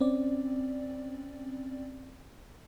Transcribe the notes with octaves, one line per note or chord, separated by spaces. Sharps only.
C4 C#4 D5